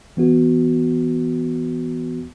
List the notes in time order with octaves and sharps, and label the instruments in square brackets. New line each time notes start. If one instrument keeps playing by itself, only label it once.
[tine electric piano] E3 B3 F#4